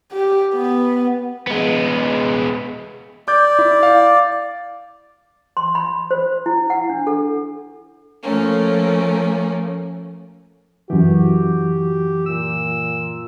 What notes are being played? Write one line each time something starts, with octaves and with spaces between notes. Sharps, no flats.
G4
B3
G#3 B3
D5 D6 G6
E4
F5
C6
B5
C5
E4
F#5
D4
A4
F3 A3 A#3 C#4
F#2 E3 F#4 G4
A#2 E6